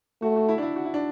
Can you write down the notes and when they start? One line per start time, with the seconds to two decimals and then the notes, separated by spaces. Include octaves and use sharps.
0.22 A3 F#4
0.36 F#4
0.49 E4
0.58 D4
0.62 E4
0.76 F#4
0.85 E4
0.94 D4